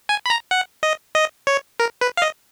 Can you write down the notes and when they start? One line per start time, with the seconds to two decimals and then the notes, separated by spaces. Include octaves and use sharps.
0.09 G#5
0.26 B5
0.30 A#5
0.51 F#5
0.83 D#5
1.15 D#5
1.47 C#5
1.80 A#4
2.01 B4
2.17 F5
2.22 D#5